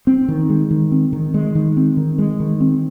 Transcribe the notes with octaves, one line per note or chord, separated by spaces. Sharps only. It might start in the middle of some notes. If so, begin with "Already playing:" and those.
C4
D#3
G#3
D#3
C4
D#3
G#3
D#3
C4
D#3
G#3
D#3
C4